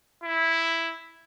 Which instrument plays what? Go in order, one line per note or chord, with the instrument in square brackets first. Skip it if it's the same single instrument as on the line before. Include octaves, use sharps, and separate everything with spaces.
[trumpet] E4